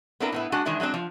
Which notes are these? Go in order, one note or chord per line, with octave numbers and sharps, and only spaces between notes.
B3 C4 D4 E4 A#4
A2 B3 E4
G#3 D4 F#4 F#5 G#5
D#3 E3 G#3 D4 E4
F#3 G#3 C4 D4
F3